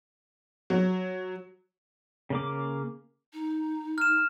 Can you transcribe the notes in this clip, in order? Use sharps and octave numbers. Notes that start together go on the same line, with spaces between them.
F#3
C#3 A#3 D6
D#4
F6 E7